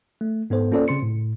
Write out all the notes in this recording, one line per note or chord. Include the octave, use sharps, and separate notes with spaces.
A3
G#2 B3 A4 C5
A#3 C#4 F4 A4 C5 D5
C#3 C4 C6 C#7
A2